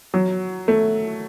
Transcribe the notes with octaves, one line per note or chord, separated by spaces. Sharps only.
F#3
A3